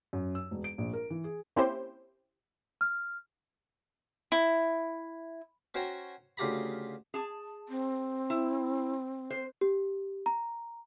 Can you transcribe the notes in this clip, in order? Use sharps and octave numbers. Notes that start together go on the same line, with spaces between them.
F#2
E6
E1
D7
A#1
A#4
E3
G#4
A#3 C4 C#4 E4 G4 C5
F6
E4
C#4 F#4 C5 G5 G#5 A#5
D2 C#3 F4 G4 A#5 B5
G#4 A5
C4
E4
C5
G4
A#5